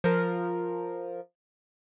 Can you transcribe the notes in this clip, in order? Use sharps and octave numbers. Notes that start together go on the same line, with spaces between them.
F3 A#4